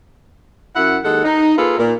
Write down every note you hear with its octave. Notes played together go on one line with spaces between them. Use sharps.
F#2 E4 F#5
D#2 G#3 A4 F#5
D#4
A#3 F4 G#4 A4 B4
A#2